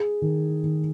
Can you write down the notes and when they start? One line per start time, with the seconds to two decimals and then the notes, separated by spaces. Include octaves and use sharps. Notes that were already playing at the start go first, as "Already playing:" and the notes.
Already playing: G#4
0.22 D#3
0.64 D#3